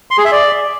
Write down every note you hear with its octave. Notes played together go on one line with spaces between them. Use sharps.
C6
G#4
E5
D5